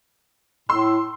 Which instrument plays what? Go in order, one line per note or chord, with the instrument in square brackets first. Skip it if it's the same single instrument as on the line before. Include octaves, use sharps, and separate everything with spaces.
[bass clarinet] A2 [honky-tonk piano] C6 E6